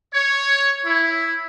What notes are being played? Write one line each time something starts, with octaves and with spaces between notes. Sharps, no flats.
C#5
E4